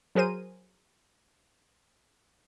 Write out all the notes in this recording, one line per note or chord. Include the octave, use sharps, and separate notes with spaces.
F#3 G#4 A#4 C5 D#7